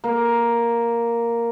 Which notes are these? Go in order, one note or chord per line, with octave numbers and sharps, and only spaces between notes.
A#3